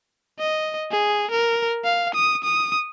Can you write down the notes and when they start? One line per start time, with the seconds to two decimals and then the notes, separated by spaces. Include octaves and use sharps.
0.39 D#5
0.91 G#4
1.31 A#4
1.84 F5
2.15 D#6
2.44 D#6